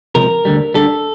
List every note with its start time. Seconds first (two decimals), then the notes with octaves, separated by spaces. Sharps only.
0.15 C#2 C3 F3 A#4
0.45 D2 D3 G3
0.74 D2 D3 G3 A4